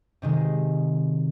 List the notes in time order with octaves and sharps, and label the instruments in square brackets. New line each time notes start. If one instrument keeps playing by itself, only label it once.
[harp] C3 D#3 G#3